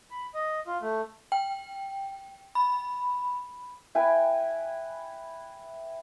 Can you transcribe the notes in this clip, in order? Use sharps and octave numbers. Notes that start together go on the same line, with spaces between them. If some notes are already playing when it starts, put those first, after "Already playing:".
B5
D#5
F4
A3
G5
B5
E4 B4 G5 G#5